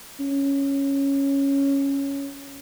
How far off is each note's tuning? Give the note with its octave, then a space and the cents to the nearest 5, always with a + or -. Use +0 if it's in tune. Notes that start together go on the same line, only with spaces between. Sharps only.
C#4 +0